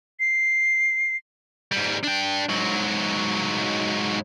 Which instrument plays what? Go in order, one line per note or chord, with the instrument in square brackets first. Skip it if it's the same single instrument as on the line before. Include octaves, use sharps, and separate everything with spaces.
[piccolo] C7
[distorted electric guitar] G#2 G3
D4 G5
G#2 F#3